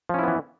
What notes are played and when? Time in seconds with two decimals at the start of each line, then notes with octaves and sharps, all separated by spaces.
0.09 F3
0.14 C#4
0.19 E4
0.23 B3
0.28 E3